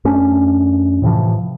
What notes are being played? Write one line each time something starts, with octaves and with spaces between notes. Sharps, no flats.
F#2 A3 C#4 D4
A2 C3 E3 F3